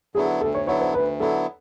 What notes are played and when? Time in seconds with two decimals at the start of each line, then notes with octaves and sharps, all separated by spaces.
0.15 D3 F#3 B3 E4 G#4
0.41 D2 A4
0.55 C#5
0.67 D3 F#3 B3 E4 C#5
0.81 C5
0.94 D2 B4
1.20 D3 F#3 B3 E4 A4